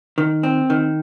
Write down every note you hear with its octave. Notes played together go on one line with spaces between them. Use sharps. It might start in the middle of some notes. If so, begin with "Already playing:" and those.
D#3
C4
D#3